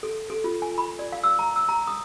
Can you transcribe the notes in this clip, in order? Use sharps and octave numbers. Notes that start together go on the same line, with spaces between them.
A4
A4
F4
G#5
B5
D5
F5
E6
A#5
E6
A#5
D#6